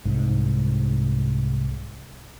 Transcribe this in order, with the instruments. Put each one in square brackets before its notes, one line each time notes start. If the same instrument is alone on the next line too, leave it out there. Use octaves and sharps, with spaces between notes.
[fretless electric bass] C2 G#2